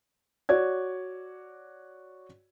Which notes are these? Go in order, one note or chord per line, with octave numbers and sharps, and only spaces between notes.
F#4 C#5 D5 G#6